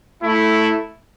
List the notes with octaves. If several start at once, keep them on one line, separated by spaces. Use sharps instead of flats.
A3 E4